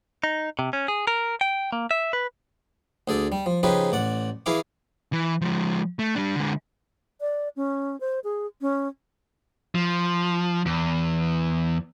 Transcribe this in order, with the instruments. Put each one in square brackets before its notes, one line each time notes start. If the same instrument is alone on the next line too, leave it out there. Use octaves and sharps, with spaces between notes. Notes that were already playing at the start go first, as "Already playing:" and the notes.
[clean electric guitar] D#4
C3
C#4
G#4
A#4
G5
A#3
E5
B4
[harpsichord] D2 G#4 A4 D5
G3
F3
C#3 F3 D#4 G4 G#4 B4
A1 D5 F#5
E3 E4 G#4 F5 D6
[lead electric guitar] E3
F3 G#3
A3
G3 D4
D3 G#3
[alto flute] D5
C#4
C5
G#4
C#4
[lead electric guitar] F3
E2